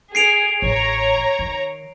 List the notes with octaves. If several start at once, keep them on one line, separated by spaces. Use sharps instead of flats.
G#4 C7 D7 F7
A1 C#5 A#5
D#3